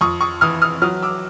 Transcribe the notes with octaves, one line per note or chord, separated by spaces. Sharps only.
F2 C#6 D#6
C#6 D#6
E3 D#6 F6
D#6 F6
F#3 D#6 F6
D6 E6